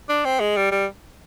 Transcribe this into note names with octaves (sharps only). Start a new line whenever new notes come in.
D4
C4
G#3
G3
G3